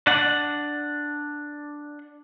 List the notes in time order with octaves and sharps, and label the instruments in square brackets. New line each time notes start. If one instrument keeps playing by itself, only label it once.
[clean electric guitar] D4 F#5